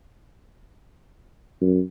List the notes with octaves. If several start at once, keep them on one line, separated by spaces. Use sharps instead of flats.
F#2